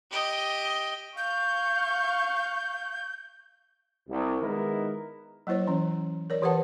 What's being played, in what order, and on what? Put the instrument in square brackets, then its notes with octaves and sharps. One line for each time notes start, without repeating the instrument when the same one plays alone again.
[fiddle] G4 D#5
[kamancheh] F5 C#6 [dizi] G6
[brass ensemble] C2
D#3 G#3 B3 D#4 E4 A#4
[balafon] F#3 A#3 E4 C5 C#5
E3 C#4
A#4 C#5 D5
E3 G4 B4 C5 F#5 A5